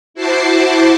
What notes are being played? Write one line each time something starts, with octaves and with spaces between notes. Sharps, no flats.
E4 F#4 C5 A5 C6 D6